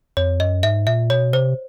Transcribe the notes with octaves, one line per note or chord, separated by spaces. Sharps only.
F2 C#5
F#2 D#5
G#2 E5
A#2 E5
B2 C#5
C3 C5